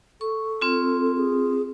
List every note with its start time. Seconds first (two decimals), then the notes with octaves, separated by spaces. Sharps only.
0.21 A4 C#6
0.61 C4 F4
1.17 G#4